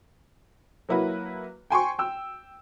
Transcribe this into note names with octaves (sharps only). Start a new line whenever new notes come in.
F#3 A#3 E4 F#4 B4
G5 G#5 C6 C#6
G5 E6